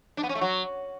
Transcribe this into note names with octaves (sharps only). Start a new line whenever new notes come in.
D4
B3
C#4
A3
F#3